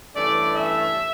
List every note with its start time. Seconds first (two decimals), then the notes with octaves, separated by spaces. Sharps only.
0.14 G2 E3 A3 C#4 D5
0.53 E5